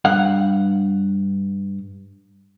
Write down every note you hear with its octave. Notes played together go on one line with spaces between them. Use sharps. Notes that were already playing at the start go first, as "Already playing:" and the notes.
G2 F5 F#5